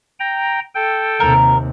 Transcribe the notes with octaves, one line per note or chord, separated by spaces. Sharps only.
G5 A#5
A4 G5
D#2 C3 A#4